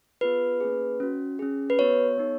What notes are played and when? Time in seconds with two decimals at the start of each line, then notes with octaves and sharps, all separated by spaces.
0.21 B3 F4 G#4 B4
0.60 A#3 C#4 G#4
1.00 C#4 F#4
1.39 C#4 G#4
1.70 B4
1.78 B3 F#4 C#5
2.18 B3 D#4 G#4